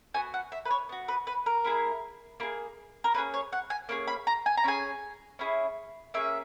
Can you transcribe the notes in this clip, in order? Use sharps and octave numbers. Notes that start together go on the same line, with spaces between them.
B3 F#4 G#5
F#5
E5
B4
C#5
B3 F#4
B4
B4
A#4
A#3 E4 G#4
A#3 E4 G#4
A#4
A#3 C#4 G#4 B4
C#5
F#5
G#5
A#3 C#4 G#4
B5
A#5
G#5
A#5
C#4 E4 G#4 G#5
C#4 E4 G#4
A#3 C#4 G#4 E5